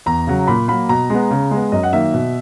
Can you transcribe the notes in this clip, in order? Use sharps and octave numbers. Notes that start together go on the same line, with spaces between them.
E2 A#5
C#3 F#3
A#2 B5
F#3 A#3 B5
B2 A#5
G#3 B3
C#3
G#3 B3
F#2 D#5
F#5
D#3 F#3 A#3 E5
B2